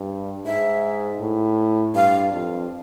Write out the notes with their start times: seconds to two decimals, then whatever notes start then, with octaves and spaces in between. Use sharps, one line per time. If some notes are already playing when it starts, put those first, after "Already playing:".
Already playing: G2
0.46 G#2 E5
1.21 A2
1.94 G2 F5
2.32 F2